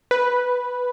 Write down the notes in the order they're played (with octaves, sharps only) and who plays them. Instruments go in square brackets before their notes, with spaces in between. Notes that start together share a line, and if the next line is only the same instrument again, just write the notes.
[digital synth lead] B4